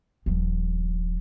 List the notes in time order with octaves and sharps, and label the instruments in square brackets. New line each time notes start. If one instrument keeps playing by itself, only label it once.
[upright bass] D#1 F3